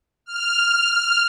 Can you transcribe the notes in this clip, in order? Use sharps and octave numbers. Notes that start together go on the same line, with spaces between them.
F6